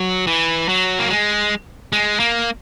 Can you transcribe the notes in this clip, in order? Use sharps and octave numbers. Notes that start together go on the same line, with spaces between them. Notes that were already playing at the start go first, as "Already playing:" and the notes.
Already playing: F#3
E3
F#3
A#3
G#3
G#3
A#3